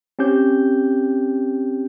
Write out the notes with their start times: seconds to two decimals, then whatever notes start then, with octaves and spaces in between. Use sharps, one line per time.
0.19 C4 C#4 G4 G6